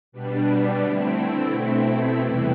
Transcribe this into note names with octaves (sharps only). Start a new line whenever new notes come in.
B2 G3 B3 D4
D3 A3 C4 E4
B2 A3 C4 E4
E2 C3 G3 B3 E4